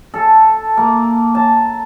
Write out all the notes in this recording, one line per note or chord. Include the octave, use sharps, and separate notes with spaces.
A4
A#3
A5